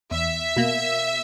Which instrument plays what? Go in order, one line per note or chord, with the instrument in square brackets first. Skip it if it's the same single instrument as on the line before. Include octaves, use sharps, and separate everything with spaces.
[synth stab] E2 [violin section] E5
[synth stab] B2 A#3